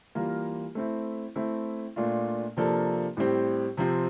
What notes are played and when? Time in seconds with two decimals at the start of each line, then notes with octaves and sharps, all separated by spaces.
0.15 E3 G3 A#3 F4 A#4
0.75 A3 C4 E4
1.36 A3 C4 E4
1.96 A#2 A3 D4 F4
2.57 C3 F3 A#3 D4 A4
3.17 A2 G3 C4 G4
3.77 C3 F3 C4